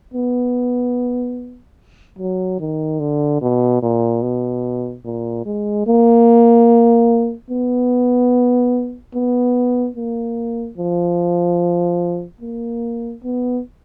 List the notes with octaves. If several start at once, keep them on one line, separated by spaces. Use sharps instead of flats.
B3
F#3
D#3
D3
B2
A#2
B2
A#2
G#3
A#3
B3
B3
A#3
F3
A#3
B3